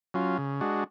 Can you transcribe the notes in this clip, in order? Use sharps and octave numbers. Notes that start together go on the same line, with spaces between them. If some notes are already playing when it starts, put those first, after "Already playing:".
F#3 C#4 F4
C#3
G#3 D4 F#4